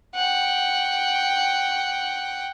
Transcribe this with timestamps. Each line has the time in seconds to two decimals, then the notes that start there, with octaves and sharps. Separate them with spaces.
0.15 F#5 G5